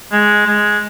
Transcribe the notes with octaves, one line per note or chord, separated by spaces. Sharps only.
G#3
G#3